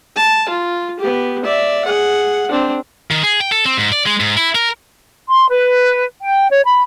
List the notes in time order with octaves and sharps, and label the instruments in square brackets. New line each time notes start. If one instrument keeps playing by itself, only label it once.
[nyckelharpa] A5
F4
B3 G4
D5 E5
G#4 F#5
C4 D4
[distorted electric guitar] D#3
G#4
G5
A4
C4
G#2
D5
G#3
G#2
E4
A#4
[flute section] C6
B4
G5
C#5
B5